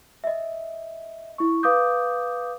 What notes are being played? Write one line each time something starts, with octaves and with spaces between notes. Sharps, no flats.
D#5 E5
E4 C#6
B4 F5 D6 D#6 G6